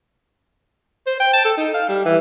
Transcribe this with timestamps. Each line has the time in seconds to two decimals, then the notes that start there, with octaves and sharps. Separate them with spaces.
1.07 C5
1.20 G5
1.33 A5
1.45 A4
1.57 D#4
1.74 F5
1.89 G3
2.05 E3